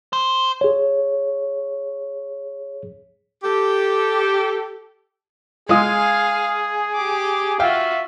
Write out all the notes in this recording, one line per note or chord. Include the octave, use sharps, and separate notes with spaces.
C5
G#4 C#5
G4 A4
G#3 F4 G#4 F5 G#5 D#6
G4 D6
F4 F#4 E5 F5 G5